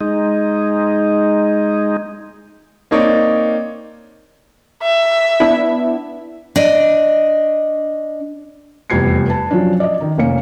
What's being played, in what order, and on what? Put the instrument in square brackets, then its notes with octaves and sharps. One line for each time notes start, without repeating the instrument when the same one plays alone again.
[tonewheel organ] G#3 D#4
[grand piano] A#3 C4 D#4 C#5 D5
[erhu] E5
[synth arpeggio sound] B3 D4 E4
[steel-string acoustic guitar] D4 D#5
[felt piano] F1 E2 G3 G#6 C7 C#7
B4 A5
F3 F#3 C#4 D4
D5 D#5
D#3 D#4
F1 A#3 C#4 C#7